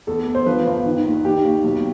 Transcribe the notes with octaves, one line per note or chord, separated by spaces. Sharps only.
E2 A4
E2
C5
F3 B4
G1
D#3
D#2
D#3 G4
D#2
B1